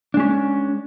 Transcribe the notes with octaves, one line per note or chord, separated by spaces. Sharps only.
G#3 C#4 D4